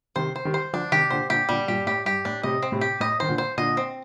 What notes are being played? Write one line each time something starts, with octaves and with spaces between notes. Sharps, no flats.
C3 D#3 C5
C5
D#3 G3
C5
D3 F3 D4
C3 D#3 G4
A#2 D3 C5
A#2 D3 G4
A#2 D3 G3
G2 A#2 G4
A2 G4
G2 G4
A2 D4
A2 C3 D#5
C4
A2 C3
G4
A2 D#5
D#3 C5
A#2 D3
C5
A#2 D3 D#5
C4